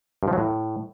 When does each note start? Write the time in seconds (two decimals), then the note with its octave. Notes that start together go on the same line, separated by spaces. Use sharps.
0.23 G2
0.28 F3
0.33 F#3
0.38 A2